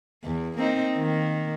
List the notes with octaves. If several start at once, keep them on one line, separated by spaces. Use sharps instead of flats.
E2
A#3 C4 D#4
D#3 A#3